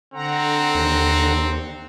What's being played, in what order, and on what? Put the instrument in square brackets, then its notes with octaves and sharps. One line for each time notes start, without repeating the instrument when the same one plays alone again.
[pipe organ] D3 F#5 A#5 [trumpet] C4
[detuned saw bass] D#2